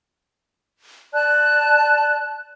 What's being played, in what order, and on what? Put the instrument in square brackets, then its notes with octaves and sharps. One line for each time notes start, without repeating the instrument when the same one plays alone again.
[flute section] D5 A5 F#6